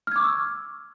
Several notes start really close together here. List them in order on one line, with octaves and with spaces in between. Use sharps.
F6 G#6 D6 C#6 E6